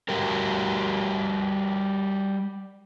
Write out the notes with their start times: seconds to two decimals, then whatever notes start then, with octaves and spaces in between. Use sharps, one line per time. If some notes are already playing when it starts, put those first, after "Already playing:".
0.09 G3 F#4 G4 A#4